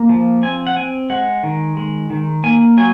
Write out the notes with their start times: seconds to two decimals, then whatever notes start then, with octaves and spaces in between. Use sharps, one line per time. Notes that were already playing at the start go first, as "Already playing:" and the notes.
Already playing: A#3
0.09 F3
0.43 C4 G#5
0.67 F#5
0.76 C4 G#5
1.10 G#3 F#5
1.43 D#3
1.77 G#3
2.10 D#3
2.44 A#3 G#5
2.77 F#3 G#5